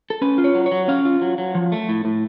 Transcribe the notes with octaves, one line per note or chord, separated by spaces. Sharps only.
A4
C#4 B4
F4
C#5
F#3
C#5
F#3
C#4 F5
F4
F#3
F#3
F3
A3
A2
A2